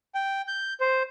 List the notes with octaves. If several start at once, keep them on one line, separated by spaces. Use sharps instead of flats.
G5
G6
C5